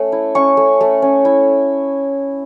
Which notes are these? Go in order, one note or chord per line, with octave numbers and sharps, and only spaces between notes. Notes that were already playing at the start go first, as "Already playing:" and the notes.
Already playing: A3 C#4
E4
C#4 C#6
A3
A3
C#4
E4